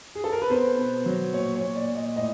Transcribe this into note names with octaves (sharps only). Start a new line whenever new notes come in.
G#4
A4
A#4
B4
B3 C5
B2
F#3
A#2 C#5
C#5
A#2
D5
A#2
D#5
A2 D#5